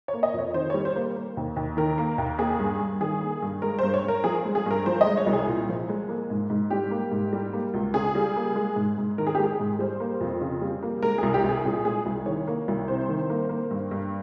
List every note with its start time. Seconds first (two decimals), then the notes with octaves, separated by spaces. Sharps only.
0.08 C#5
0.13 A#3
0.23 D#5
0.34 F2
0.39 C#5
0.54 D#3 C5
0.70 G3 C#5
0.85 C5
0.96 A#3
1.16 A#3
1.37 D#2
1.56 D#2
1.77 D#3 A#4
1.98 A#3
2.18 D#2
2.39 A#3 G#4
2.60 G2
2.81 G2
3.00 D#3 G#4
3.21 A#3
3.42 G2
3.62 G#3 A#4
3.79 G2 C5
3.94 C#5
4.04 G2 A#4
4.24 F3 G#4
4.45 G#3
4.55 G#4
4.66 G2 A#4
4.86 F3 C5
5.01 D#5
5.06 G#3
5.17 C#5
5.27 C2
5.33 G#4
5.48 A#2
5.69 F3
5.89 G#3
6.09 A#3
6.30 G#2
6.50 G#2
6.70 G3 G4
6.91 A#3
7.12 G#2
7.33 G3
7.53 A#3
7.74 C#2
7.94 C#3 G#4
8.15 G3
8.36 A#3
8.56 G#3
8.76 G#2
8.98 G#2
9.18 D#3 A#4
9.27 G#4
9.35 G4
9.39 G#3 G#4
9.60 G#2
9.79 G3 C5
10.00 A#3
10.20 F2
10.41 C#3
10.61 G3
10.83 A#3
11.02 G#3 A#4
11.18 C2 G#4
11.34 G4
11.44 C2 G#4
11.65 A#2 G#4
11.85 G#3 G#4
12.06 C2
12.26 D#3 C#5
12.48 A#3
12.68 C2
12.88 C3 C5
13.08 D#3
13.30 A#3
13.49 A#3
13.71 G2
13.91 G2